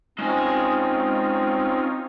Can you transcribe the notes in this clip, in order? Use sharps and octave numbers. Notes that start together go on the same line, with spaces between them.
G#3 C4 C#4 D#4 F4 G#5